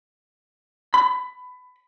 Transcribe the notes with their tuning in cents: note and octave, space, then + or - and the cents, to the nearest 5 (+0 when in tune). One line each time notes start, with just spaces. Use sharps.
B5 +20